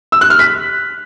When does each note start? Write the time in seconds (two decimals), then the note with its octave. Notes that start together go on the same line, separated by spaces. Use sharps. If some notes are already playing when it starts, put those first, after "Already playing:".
0.12 E6
0.21 F#6
0.30 F6
0.39 B6